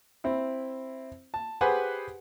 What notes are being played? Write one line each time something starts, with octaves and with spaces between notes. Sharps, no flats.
C4 E4
A5
G4 G#4 B4 C5 F#5 G#5